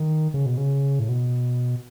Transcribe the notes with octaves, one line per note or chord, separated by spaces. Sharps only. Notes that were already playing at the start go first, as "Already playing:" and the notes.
Already playing: D#3
C#3
B2
C#3
A2
B2